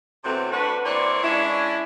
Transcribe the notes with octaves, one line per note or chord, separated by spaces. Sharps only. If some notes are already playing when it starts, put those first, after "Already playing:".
E2 C3 F#3 A3 C4 F#4
D4 F#4 B4
E3 A#3 C4 C#5 D5
G#3 C#4 D4 E4